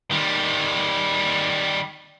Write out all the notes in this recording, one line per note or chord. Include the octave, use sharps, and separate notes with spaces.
D#3 G3